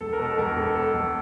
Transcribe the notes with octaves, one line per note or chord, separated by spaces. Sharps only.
E1 A4
A#4
B2
A4
E1 A#4
E1 A4
B2 A4
E1